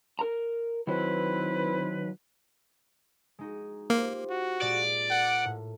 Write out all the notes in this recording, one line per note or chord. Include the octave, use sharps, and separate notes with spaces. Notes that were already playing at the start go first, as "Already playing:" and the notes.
A#4 A#5
D#3 F#3 C4 E4 B4
G#3 D#4 F#4
A#3 F4 G4 C5
F#4
A#2 G#3 D5
A#4 F#5
A2